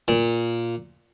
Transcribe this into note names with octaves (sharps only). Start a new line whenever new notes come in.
A#2